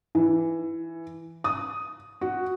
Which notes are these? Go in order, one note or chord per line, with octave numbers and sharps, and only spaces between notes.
E3
D#6
F#4